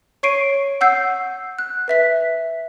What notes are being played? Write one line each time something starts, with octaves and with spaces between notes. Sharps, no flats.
C#5 C#6 C7 D7 D#7
F#5 E6 G6 C7
F#6
B4 E5 B6